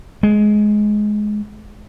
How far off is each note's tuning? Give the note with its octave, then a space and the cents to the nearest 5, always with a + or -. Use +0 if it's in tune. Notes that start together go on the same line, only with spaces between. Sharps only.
G#3 +15